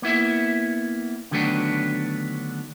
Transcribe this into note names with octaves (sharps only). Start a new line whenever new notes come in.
A#3 B3 E4 E5
D3 D#3 F#3 A3 B3 D4